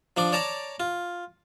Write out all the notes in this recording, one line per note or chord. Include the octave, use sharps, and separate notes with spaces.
F3 D4 D5
C#5 D5 A5 A#5 D6
F4